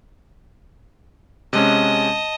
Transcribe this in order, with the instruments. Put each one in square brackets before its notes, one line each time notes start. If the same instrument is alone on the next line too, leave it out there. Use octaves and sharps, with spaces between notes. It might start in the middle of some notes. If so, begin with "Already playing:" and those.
[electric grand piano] C3 G#3 C#4 [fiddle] D#5 A5